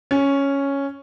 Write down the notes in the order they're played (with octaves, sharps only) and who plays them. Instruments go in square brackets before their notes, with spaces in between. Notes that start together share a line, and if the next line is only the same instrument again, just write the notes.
[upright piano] C#4